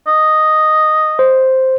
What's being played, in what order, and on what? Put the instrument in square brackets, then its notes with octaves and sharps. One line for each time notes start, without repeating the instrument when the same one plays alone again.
[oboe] D#5
[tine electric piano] C5